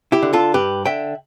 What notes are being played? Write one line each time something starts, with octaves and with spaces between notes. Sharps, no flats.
E4 G4
D3
F4 A4
G2 G4 B4
D3 E5 G5